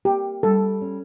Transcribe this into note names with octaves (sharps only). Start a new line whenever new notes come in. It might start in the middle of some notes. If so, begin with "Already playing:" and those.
A#3 G4
G3 A4
C#4